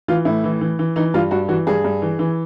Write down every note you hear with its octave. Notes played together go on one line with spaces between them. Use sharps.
E3 F4
A2 E4
E3
E3
E3
E3 D#4
G2 F4
G2 F#4
E3 F#4
G2 G#4
G2
E3
E3